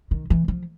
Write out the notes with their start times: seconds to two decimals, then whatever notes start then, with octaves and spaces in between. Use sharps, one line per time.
0.11 D#3
0.30 E3
0.48 F3